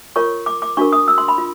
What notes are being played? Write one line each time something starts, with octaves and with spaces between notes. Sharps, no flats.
F4 A#4 C#5 C#6
D6
D6
D4 F#4 A#4 C#6
D#6
E6
C6
B5
F4